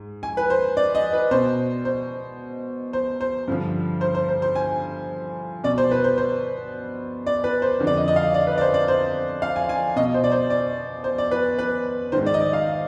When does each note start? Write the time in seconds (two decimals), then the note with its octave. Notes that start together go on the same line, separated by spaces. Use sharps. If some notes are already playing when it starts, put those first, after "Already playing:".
Already playing: G#2
0.23 G#5
0.37 B4
0.50 C5
0.77 D5
0.95 D#5
1.13 B4
1.31 B2 C5
1.85 C5
2.93 C5
3.21 C5
3.48 G2 D3 F3
4.01 C5
4.15 C5
4.29 C5
4.42 C5
4.55 G#5
5.64 B2 D5
5.78 C5
5.91 B4
6.04 C5
6.18 C5
7.27 D5
7.44 B4
7.62 C5
7.80 F2 D3 F3
7.87 D5
7.97 D#5
8.08 D#5
8.16 F5
8.34 D5
8.47 B4
8.58 D5
8.61 C5
8.74 D5
8.88 C5
9.42 F5
9.56 G#5
9.69 G#5
9.96 B2 D#5
10.14 C5
10.24 D5
10.32 C5
10.50 D5
11.04 C5
11.18 D5
11.31 B4
11.59 B4
12.12 G#2 D#3 C5
12.26 D5
12.34 D#5
12.40 D5
12.53 F5